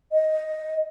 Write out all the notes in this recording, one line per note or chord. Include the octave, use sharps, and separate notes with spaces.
D#5